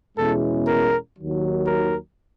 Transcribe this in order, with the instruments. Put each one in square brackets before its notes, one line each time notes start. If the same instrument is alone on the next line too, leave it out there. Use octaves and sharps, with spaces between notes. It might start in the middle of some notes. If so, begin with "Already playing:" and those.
[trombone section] E2 B2 G#3 C#4 E4 [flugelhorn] A4
[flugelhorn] A#4
[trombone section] D#2 D#3 F#3
[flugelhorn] A#4